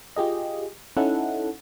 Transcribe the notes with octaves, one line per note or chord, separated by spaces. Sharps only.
F4 G4 G#4 D#5
C#4 D#4 E4 A4 F#5